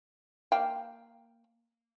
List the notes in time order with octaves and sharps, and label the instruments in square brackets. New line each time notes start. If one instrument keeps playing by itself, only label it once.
[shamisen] A#3 F5 G5